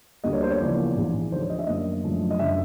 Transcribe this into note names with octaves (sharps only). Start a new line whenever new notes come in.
D2 D3 G3 A#3 D#5
C#5
C5
C#5
E2 C#3 F3 A#3 D5
A#1 G#2 E3 G#3
D#2 D3 F3 C5
C#5
D#5
E5
F#2 D3 F#3 A#3 D#5
F#2 D3 F3 A3
D#5
F#1 D3 E5